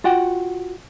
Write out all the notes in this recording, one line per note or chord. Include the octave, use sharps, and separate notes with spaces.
F4 F#4 F#5 G5